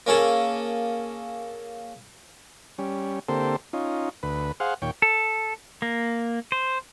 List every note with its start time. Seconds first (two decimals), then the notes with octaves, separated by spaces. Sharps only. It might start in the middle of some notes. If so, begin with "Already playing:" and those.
0.07 A#3 C#4 G#4 A4
2.78 G3 C#4
3.29 D3 A#3 C4 G4 A4 C5
3.73 C#4 D#4 F4
4.23 D2 B4
4.60 G#4 C5 F5 F#5
4.82 D#2 A#2 C#5 G5
5.02 A4
5.82 A#3
6.52 C5